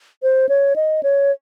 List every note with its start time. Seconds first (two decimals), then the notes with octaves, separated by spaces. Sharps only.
0.23 C5
0.49 C#5
0.76 D#5
1.03 C#5